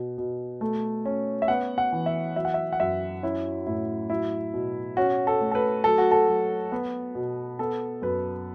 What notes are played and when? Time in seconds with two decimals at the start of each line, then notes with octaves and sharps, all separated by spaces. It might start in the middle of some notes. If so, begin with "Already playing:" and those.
Already playing: B2
0.18 B2
0.61 A3
1.06 C#4
1.42 E5
1.48 B3 F#5
1.78 F#5
1.93 E3
2.06 E5
2.36 F#3 E5
2.45 F#5
2.54 E5
2.73 F#5
2.80 F#2 E5
3.23 C#4 E4
3.67 A2 E4
4.10 F#3 E4
4.54 B2
4.97 C#4 F#4
5.27 A4
5.41 A3
5.51 A4
5.55 B4
5.84 F#3 A4
5.98 F#4
6.11 A4
6.28 F#3
6.72 B3
7.15 B2
7.59 B3 A4
8.02 F#2 B4